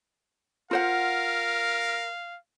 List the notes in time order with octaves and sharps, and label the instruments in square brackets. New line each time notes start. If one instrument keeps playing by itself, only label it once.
[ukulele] F4 C5 F#5 [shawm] A#4 [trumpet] F5